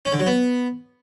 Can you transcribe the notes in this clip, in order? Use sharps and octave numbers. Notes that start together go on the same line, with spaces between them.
C#4
D3
F#3
B3